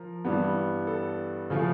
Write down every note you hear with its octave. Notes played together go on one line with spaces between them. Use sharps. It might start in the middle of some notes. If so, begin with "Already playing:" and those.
Already playing: F3 A#4
G2 E3 G3 B3
A4
C#3 F3 A3